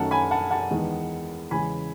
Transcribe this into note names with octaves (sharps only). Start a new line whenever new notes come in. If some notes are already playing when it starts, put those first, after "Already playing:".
Already playing: F#2 D#3 A3 C#4 F#5 A5
G#5 B5
F#5 A5
F#5 A5
E2 D#3 G#3 B3
E2 C#3 G#3 G#5 B5